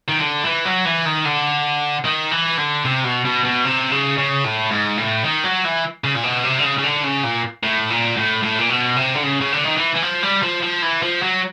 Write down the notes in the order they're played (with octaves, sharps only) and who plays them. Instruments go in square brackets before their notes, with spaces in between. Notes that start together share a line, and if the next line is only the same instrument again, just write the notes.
[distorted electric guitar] D#3
D3
E3
F#3
E3
D#3
D3
D#3
E3
D3
C3
B2
B2
B2
C3
C#3
C#3
A2
G#2
A2
D#3
F#3
E3
C#3
A#2
B2
C3
D3
C#3
C#3
D3
C#3
A#2
A2
A#2
A2
A2
A#2
B2
C3
D3
C#3
C#3
D3
D#3
E3
E3
F3
G3
F3
F3
E3
F3
F#3